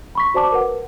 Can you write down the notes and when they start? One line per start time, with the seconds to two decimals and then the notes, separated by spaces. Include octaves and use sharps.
0.15 B5 C#6 B6
0.34 F#4 C5 D5 A5 D6
0.52 A#4 B4 F#5